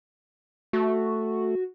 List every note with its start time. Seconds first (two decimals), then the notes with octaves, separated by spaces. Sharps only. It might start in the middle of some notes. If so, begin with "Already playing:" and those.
0.73 A3 F#4